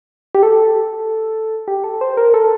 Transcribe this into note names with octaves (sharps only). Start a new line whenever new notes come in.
G4
A4
G4
A4
C5
A#4
A4